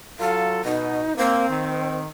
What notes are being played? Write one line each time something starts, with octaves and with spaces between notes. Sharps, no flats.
F#3 F4 A4 F5
B2 D#4
A#3 C4
D#3